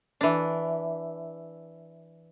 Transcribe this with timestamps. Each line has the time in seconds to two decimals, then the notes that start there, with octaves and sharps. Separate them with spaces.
0.21 E3 D4